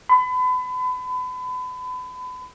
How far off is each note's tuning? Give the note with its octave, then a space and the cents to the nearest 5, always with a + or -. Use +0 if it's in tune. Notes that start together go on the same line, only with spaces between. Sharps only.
B5 +35